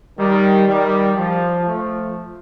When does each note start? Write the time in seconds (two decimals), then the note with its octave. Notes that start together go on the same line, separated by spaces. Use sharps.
0.18 D#3 G3
0.67 D#3 G3
1.16 F3
1.65 F3 A3